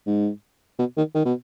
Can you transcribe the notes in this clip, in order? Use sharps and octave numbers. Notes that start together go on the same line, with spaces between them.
G#2
B2
D#3
D#3
B2